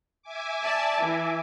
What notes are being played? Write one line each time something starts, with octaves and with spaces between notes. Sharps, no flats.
E5 G#5 D6
D5 A5
E3